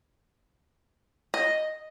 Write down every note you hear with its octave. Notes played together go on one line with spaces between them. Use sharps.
D#5